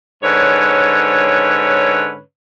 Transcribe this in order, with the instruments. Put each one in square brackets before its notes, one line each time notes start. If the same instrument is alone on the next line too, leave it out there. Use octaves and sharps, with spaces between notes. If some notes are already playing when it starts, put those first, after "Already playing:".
[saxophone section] G#2 D3 C#4 B4 C#5